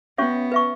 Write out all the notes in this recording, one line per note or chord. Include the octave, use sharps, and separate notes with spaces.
B3 C#4 F#4 C#5 E5 C#6
B4 E5 C#6